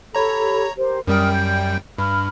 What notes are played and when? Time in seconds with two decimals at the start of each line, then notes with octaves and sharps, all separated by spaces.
0.15 G4 A4 C#5 A#5 B5
0.77 G4 A#4 C5
1.07 F#2 G3 A#4 G5 D#6 F6
1.32 G6
1.98 G2 B5 F6